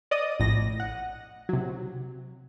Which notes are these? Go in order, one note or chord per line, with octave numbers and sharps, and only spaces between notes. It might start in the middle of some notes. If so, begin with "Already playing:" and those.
D5 D#5 D#6
A#1 A2 A#6
F#5
C3 F#3